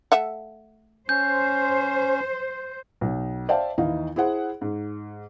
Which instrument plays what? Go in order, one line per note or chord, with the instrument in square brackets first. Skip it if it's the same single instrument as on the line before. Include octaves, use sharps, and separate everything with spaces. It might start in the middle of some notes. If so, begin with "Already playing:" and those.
[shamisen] A3 E5 F#5
[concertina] C#4 [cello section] C5 [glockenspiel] G6
[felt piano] B1
C5 D5 E5 F5 G5 A5
D#2 E3 D#4 E4 F5
E4 G#4 C5 F#5
G#2